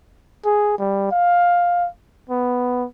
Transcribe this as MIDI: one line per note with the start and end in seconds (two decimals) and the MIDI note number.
0.45 0.76 68
0.78 1.10 55
1.11 1.88 77
2.30 2.86 59